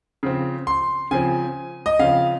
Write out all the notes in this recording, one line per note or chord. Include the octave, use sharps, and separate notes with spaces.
C#3 F3 C4
C6
C#3 F3 C4 G#5
D#5
C#3 F3 C4 F5